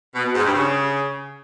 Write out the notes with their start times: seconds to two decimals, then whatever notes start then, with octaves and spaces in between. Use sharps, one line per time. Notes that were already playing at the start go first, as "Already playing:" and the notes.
0.15 B2
0.25 B2
0.35 G#2
0.45 G2
0.55 C#3